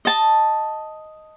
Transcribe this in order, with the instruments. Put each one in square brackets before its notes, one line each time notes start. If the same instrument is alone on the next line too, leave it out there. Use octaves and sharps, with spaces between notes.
[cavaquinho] D#5 A5